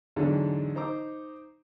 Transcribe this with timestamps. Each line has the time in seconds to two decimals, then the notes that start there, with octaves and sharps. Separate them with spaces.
0.16 E2 G#2 D3 F#3 D4 A4
0.75 D#4 C5 A#5 D6